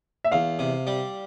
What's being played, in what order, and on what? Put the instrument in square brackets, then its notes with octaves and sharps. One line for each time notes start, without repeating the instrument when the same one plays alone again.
[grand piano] E5
[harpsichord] E2 [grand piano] F5
[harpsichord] C3
G3